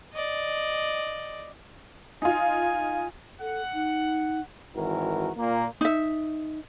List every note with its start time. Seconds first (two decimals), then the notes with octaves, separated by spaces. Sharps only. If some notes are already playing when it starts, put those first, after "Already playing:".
0.14 D5 D#5
2.22 D#4 F4 G#5
3.41 A4 F#5
3.74 D#4
4.76 G#1 E3 F#4 A#4
5.36 A#2 A#3
5.81 D#4 E5